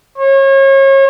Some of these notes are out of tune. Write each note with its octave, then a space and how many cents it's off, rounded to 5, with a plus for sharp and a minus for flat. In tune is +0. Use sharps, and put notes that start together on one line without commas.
C#5 -35